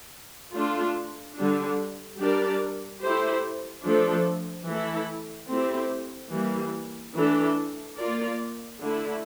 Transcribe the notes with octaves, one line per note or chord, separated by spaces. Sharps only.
A3 D4 F4
D3 G3 D4
G3 D4 G4 A#4 D5
A3 E4 G4 C5
F3 A3 D4 A4
E3 A3 E4 A4
A3 C4 E4 G4
E3 G3 A#3
E3 A3 D4 A4
A#3 F4 A#4 D5
D3 A3 E4